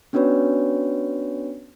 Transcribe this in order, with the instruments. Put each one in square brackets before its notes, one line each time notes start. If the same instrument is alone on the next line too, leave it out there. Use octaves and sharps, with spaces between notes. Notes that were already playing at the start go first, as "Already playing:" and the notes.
[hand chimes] B3 C#4 D4 F#4 B4 C#5